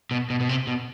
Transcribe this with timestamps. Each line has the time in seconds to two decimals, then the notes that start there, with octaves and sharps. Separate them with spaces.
0.11 B2
0.30 B2
0.40 B2
0.49 C3
0.67 B2